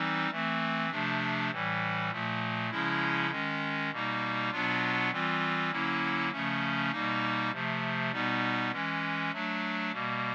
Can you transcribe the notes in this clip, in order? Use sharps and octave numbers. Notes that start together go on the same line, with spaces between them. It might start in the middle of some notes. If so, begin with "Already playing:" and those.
Already playing: E3 G3 C4 D#4
E3 A3 C4
C3 F3 A3 D4
A2 E3 G3
A#2 F3 A3
C#3 F3 G#3 C#4 E4
D#3 G#3 C#4
B2 G3 A#3 D#4
B2 F#3 B3 D4 F4
E3 G3 C4 F4
D3 F#3 A#3 C#4 E4
C#3 F3 A3 C#4
B2 G3 A#3 D#4
C3 F3 A3
B2 G3 B3 D#4
E3 G#3 C#4
F#3 A3 D4
B2 G3 A#3